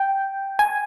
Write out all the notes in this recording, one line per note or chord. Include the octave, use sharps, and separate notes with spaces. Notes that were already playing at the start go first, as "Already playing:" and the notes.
Already playing: G5
G#5